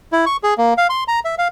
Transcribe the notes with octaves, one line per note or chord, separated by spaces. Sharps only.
E4
C#6
G#4
A#3
F5
C6
A#5
E5
F5